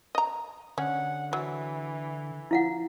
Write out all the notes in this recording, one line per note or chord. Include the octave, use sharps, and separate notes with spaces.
D#5 A#5
D3 C#4 F#5
E3 F#3
F3 E4 F5 F#5